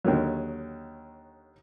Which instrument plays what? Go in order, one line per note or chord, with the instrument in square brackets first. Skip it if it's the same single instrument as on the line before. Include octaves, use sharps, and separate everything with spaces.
[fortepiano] D#2 D3 D#3 F#3